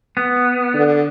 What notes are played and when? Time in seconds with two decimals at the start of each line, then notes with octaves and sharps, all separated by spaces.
0.17 B3
0.74 D3